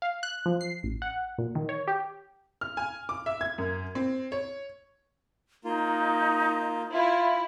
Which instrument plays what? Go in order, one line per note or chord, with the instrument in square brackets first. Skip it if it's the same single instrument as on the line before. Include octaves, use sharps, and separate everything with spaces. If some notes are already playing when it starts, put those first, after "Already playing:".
[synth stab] F5
F#6
F3
C7
A1
F#5
A#2
D#3
C#5
G4
[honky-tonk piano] F6
G#5
D6
E5
G#6
F#2
C4
C#5
[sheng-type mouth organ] A#3 F4 [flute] D#4
[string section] E4 [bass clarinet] F4